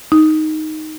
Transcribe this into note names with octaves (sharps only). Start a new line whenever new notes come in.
D#4